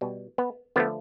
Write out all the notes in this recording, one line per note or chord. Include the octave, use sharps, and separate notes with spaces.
B2 G3
B3
D3 F3 A3 B3